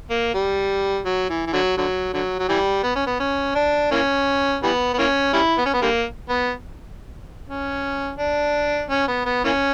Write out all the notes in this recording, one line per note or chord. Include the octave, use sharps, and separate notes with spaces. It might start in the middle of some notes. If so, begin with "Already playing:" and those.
A#3
G3
F#3
E3
E3
D3 F#3
D3 F#3
D3 F#3
F#3
E3 G3
B3
C#4
B3
C#4
D4
E3 A#3 C#4
E3 G3 B3
B3
E3 A#3 C#4
G3 C#4 E4
B3
C#4
B3
D3 G3 A#3
B3
C#4
D4
C#4
B3
B3
E3 A#3 C#4